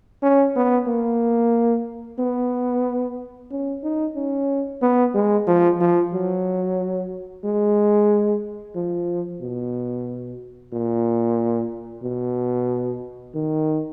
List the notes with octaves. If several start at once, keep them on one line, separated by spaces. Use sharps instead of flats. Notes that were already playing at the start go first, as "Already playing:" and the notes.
C#4
B3
A#3
B3
C#4
D#4
C#4
B3
G#3
F3
F3
F#3
G#3
F3
B2
A#2
B2
D#3